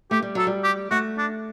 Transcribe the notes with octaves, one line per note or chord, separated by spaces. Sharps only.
A3 G4
G3
F#3 A4
G3
G4
A3 F#4
D4